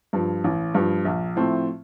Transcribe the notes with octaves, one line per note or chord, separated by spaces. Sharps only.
G2 F3
A1
G2 F3
A#1
A2 F3 A3 C4